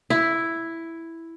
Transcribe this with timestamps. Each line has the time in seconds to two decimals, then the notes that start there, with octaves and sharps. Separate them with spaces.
0.10 E4